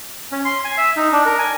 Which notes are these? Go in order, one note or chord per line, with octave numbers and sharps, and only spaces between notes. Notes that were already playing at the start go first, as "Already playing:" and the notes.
C#4
C6
G#5
E5
D#4
D4
A#4
G#5